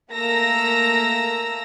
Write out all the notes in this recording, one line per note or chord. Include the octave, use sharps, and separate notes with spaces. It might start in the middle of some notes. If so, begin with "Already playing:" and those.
A3 A#3 A#5 E6 A#6